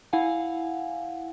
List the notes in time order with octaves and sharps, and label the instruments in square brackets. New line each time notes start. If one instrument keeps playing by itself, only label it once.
[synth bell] E4 F5 F#5 G#5